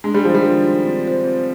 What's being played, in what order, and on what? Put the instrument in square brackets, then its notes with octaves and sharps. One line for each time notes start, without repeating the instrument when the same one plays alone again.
[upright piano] G#3 [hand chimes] D4
[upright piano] G3
[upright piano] F3 [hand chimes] F4 C5
[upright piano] D#3 G3
[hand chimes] D4
F4 C5
C4
F4 C5
C4